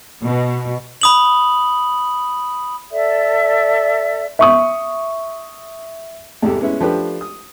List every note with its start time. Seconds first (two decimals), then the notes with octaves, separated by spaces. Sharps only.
0.24 B2
1.01 B5 D#6 F#7
2.90 A4 D5 E5
4.39 E5 C#6 D#6
6.42 E2 G#2 C3 G4 A4
6.61 G#3 B3 C#4 E4
6.81 F3 A3 D4 G4 B4
7.21 D#6